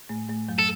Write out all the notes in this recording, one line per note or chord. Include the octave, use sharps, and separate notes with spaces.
A2 A3
A2 A3
F#2 F#3
A4